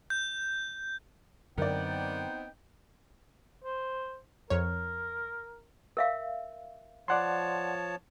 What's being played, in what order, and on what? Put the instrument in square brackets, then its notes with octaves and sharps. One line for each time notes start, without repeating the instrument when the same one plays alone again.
[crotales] G6
[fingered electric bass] F#2 D3 [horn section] B3 C4 [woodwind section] D#4 G5 [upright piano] A#4 D5
[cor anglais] C5
[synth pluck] F2 C#5 [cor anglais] A#4
[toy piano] A#4 E5 F5
[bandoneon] F3 C#5 A5 [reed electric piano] D5 F#5 C6